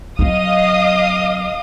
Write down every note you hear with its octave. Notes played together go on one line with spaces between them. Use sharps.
F#3 C4 D#5 F5 D#6